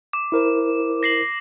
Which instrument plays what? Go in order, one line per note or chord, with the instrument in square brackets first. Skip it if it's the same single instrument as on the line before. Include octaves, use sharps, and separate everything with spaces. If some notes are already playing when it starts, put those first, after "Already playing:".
[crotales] D6
[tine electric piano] E4 A#4 C5
[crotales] A#6 C7 F#7